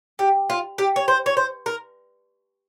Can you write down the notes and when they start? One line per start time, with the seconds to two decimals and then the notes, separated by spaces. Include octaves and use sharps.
0.19 G4
0.50 F4
0.78 G4
0.96 C#5
1.08 C5
1.26 C#5
1.37 C5
1.66 A#4